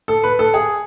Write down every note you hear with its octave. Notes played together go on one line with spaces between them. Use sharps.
A4
B4
A4
G#4